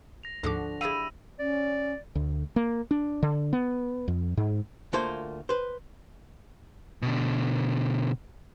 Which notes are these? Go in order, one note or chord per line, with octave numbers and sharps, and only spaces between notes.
A#6 F7
D2 G#2 D3 F3 F#4 D6
E4 G4 G#4 F5 B5 E6 D#7 F7
C#4 D5
D2
A#3
D4
D3
B3
F2
G#2
D2 A3 A#3 F4 C5
B4 C5
B2 D3